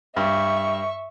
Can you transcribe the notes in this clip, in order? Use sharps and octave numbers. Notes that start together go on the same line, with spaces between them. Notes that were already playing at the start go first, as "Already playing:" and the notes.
G2 E5 C#6